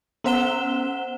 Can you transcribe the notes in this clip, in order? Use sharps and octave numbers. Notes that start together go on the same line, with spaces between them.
B3 C#4 C5 F#5 E7 G7